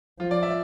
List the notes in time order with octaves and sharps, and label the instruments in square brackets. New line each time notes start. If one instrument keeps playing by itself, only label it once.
[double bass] F3 [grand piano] F4
[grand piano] D5
E5